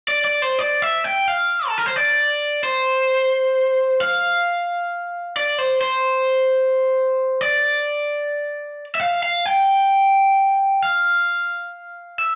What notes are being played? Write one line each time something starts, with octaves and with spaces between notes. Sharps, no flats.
D5
D5
C5
D5
E5
G5
F5
A4
A#4
C5
D5
C5
F5
D5
C5
C5
D5
E5
F5
F5
G5
F5
E5